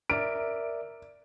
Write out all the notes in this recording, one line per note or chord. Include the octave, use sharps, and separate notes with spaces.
A#4 D5 E5 D7